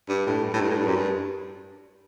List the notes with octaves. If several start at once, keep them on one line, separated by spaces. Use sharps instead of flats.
G2
A2
G2
A2
G2
A2
G2
F#2
G2